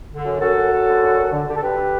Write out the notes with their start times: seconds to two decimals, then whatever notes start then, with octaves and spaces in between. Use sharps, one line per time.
0.09 D3
0.25 F#2
0.40 F#2 F#4 A4
0.55 F#2
0.70 F#2
0.86 D3
1.01 F#2
1.16 D3
1.32 D3
1.47 D3 G4
1.56 A4
1.62 D3 G4 B4
1.78 D3